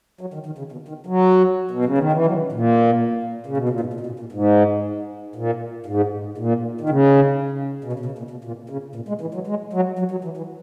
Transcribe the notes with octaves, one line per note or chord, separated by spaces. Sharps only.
F#3
D#3
D#3
C#3
B2
D#3
F#3
B2
C#3
D#3
E3
F#3
A#2
C#3
B2
A#2
G#2
A#2
B2
A#2
A#2
G#2
A#2
G#2
A#2
D#3
C#3
B2
C#3
B2
C#3
A#2
B2
A#2
C#3
A#2
G#3
E3
F#3
G#3
F#3
F#3
F#3
E3
E3